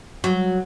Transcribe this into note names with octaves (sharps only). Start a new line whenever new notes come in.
F#3